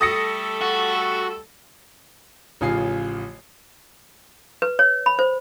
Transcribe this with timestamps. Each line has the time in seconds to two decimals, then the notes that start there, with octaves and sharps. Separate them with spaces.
0.01 G3 A3 A4 D#6 A#6 C#7
0.61 F#4
2.61 A1 C#3 F3 F4 G#5 C7
4.62 B4
4.79 C#5
5.06 B5
5.19 C5